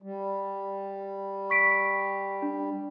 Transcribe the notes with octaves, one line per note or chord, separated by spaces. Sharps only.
G3
C#6 B6 D7
D4